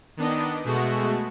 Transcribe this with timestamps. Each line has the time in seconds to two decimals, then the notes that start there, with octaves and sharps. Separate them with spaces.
0.17 D#3 B3 D4 D#5
0.64 B2 G#3 A3 F#4